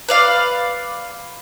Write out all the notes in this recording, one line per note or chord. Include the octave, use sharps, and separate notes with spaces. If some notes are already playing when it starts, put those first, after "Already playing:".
B4 D5 F5